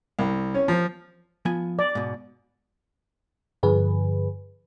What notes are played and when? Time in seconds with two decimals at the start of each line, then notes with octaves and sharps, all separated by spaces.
0.19 C2
0.54 C#4
0.68 F3
1.45 F3 B3 G#5
1.79 D5
1.95 G#2 B2
3.63 G2 D3 F3 G#4 B4